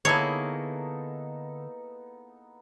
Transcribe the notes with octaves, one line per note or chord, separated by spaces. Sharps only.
D3 A#3 B3 D#4 E4 G#4 A4 C#5